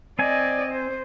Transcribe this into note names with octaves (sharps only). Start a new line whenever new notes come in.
C4 D5 D#5 G#5
C5